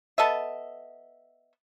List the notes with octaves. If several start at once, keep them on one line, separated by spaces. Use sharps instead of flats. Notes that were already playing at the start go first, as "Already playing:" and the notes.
B3 A4 D#5 E5